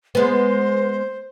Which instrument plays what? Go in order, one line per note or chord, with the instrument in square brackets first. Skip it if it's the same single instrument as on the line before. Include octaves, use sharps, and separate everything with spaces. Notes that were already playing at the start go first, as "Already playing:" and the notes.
[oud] G#3 B3 [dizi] C5